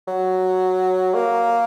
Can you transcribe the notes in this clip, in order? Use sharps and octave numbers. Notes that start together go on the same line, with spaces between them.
F#3
A#3